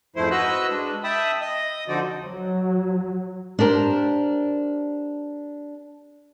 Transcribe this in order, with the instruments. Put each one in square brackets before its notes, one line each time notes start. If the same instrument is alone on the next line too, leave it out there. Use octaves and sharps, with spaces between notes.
[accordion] F2 G#2 F3 A3 E4 C5
F#4 B4 D#5 E6 F#6
G#3 D4
E5 G5 A5 B5 D#6
D#5 D#6
D3 F3 C4 D#4 F#4 D5
[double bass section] F#3
[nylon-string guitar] D4 G4 A#4 C5